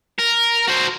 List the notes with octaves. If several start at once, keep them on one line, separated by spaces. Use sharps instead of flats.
A#4
F#4 C5